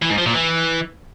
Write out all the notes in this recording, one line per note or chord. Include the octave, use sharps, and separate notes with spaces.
E3
G#2
F3
A#2
E3